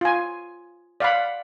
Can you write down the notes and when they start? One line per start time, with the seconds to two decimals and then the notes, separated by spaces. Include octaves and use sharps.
0.01 F4 G#5
1.00 D5 F5 F#5 B5